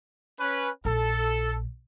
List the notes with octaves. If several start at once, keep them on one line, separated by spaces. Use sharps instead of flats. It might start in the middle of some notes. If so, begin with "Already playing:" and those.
C#4 B4
A#1 A4